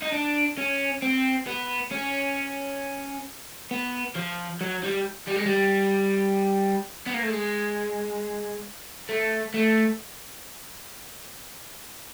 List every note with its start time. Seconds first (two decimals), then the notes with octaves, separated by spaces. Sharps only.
0.02 D#4
0.12 D4
0.58 C#4
1.02 C4
1.47 B3
1.92 C#4
3.71 B3
4.16 F3
4.61 F#3
4.84 G3
5.28 G3
5.36 G#3
5.46 G3
7.06 B3
7.14 A#3
7.22 A3
7.30 G#3
9.09 A3
9.54 A3